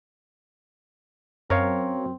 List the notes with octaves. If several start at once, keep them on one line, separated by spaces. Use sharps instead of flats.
F#2 C4 A#4 C#5 F5